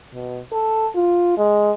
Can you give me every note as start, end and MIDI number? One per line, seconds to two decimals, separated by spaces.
0.13 0.40 47
0.52 0.87 69
0.95 1.33 65
1.37 1.71 56